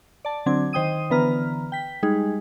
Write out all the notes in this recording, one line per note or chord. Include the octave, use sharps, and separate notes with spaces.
D5 A5
D3 F#3 C4 D4 G#6
D#3 C5 G5 D#6 D#7
D3 E3 B3 B4 A#5 F6
G5 B6
G3 G#3 D#4 G#4